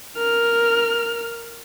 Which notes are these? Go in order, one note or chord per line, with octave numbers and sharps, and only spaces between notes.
A#4 F6